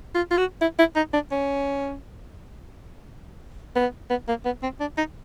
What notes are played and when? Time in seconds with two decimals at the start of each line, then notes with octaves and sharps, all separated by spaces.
0.15 F4
0.31 F4
0.37 F#4
0.61 E4
0.79 E4
0.96 D#4
1.13 D4
1.32 C#4
3.75 B3
4.10 B3
4.28 A#3
4.45 B3
4.63 C4
4.80 D4
4.98 D#4